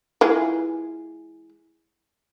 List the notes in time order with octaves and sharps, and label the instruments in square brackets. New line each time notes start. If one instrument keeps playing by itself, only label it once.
[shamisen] E3 G#3 F4